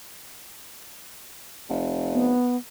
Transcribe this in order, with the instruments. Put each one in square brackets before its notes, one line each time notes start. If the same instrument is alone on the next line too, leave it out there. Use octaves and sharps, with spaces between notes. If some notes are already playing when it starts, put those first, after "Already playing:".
[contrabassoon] F1
[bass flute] B3